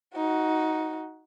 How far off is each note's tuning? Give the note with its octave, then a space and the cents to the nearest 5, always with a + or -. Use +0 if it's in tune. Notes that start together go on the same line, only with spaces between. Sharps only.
D#4 +15 F#4 +0